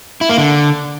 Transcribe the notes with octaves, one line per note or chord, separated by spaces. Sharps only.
E4
A#3
D3